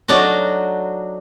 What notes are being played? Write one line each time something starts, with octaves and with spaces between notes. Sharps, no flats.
F#3 A3 D4 D#4 F#4